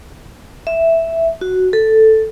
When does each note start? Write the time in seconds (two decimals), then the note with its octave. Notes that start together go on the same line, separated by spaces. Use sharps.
0.67 E5
1.41 F#4
1.73 A4